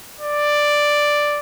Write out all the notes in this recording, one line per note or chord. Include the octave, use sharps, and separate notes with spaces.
D5